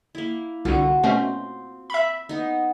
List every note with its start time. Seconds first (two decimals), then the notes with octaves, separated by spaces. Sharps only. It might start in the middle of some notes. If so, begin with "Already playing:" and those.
0.15 A#3 E4
0.65 C2 D3 F4 F#4
1.03 B2 A3 C4 C#4
1.90 E5 B5
2.29 B3 D#4